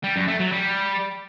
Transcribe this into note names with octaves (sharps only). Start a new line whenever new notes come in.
G3
F#2
A3
F#3
G3